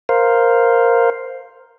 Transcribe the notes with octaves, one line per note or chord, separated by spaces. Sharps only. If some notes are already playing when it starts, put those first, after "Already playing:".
A#4 C5 F5